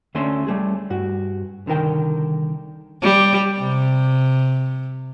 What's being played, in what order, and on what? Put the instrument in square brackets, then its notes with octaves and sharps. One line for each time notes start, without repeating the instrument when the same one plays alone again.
[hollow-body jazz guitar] D2 A3 C#4 D4 C6
G3 A3 G#4
G2 F#4
C2 D3 D#3 A#4 G5
[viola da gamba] G3
C3